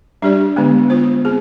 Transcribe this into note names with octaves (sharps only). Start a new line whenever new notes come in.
G3 D4 G4 D5
D3 G#3 B3
B3 F4 C5
C4 G#4